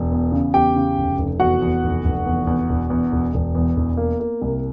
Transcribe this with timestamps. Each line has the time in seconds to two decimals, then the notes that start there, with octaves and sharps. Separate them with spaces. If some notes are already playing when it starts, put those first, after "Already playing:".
Already playing: E1
0.11 E2
0.32 C#3
0.54 E2 G4 G5
0.76 C#3
0.98 F1
1.18 F1
1.40 E2 F#4 F#5
1.62 E2
1.84 F1
2.05 F1
2.26 E2
2.47 E2
2.69 E1
2.90 E2
3.12 E1
3.34 E1
3.55 E2
3.76 E1
3.97 A#3
4.20 A#3
4.42 C2